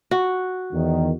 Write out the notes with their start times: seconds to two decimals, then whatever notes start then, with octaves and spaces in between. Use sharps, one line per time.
0.11 F#4
0.73 E2 D#3